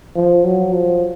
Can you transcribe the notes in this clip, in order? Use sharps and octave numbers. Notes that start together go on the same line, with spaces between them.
F3
F#3
F3